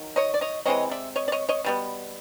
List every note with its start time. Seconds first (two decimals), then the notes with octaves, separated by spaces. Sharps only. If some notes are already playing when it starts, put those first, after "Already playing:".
Already playing: D#3 F#3
0.16 C#5 D#5
0.34 D5
0.41 C#5 D#5
0.66 C3 E3 G#3 C4 C#5 D#5
0.91 D5 E5
1.16 C#5 D#5
1.28 D5
1.32 C#5 D#5
1.49 C#5 D#5
1.65 B2 G3 B3